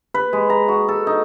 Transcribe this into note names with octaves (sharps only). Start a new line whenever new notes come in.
B4
G#3
A#5
F#4
A4
D#4